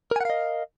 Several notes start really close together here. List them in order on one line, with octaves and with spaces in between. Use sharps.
A#4 G#5 F#5 F5 D#5